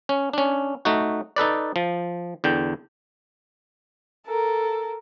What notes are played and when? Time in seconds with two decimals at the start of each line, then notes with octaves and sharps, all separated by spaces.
0.09 C#4
0.33 C#4 D4
0.85 A3 D#4 F#4
1.36 D#4 A4 B4 D5
1.76 F3
2.44 E2 D3 G5
4.26 A4 A#4